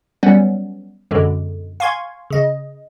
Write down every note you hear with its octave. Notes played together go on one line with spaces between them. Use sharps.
F#3 G3 B3 C#4
F#2 B2 D3 G#3
F5 G#5 C6 C#6 G#6
C#3 D#5